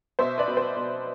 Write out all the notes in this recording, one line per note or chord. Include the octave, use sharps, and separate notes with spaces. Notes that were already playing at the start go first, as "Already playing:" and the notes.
B2 C5 E5
B4 D5
B2
C5
B2